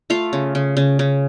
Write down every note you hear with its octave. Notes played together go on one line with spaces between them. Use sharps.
A3 F4 F5
C#3
C#3
C#3
C#3